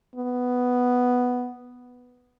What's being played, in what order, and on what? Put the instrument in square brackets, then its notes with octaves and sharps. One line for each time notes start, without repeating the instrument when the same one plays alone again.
[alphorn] B3